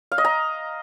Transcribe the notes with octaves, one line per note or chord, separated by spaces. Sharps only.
F5
D#5
A#5